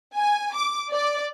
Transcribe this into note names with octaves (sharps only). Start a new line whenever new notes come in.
G#5
D6
D5